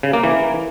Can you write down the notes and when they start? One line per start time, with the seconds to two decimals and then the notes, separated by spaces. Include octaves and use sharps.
0.03 C#3
0.13 A#3
0.24 E3